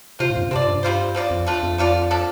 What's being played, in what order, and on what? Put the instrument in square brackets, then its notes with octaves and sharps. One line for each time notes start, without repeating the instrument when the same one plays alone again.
[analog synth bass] C3 [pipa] C4 F4 C5
[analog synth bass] A2
F2
G2
[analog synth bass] C3 [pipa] C4 A4 D5
[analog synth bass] G2
[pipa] G3 C4 F4 C5
F3 C4 A4 D5
[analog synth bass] F2
[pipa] A3 D4 F4
[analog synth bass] F2
[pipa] D3 A3 F4 D5
F3 D4 A4